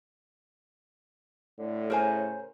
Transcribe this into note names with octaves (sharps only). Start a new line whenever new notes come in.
A2 D3
C#3 A#4 C5 G#5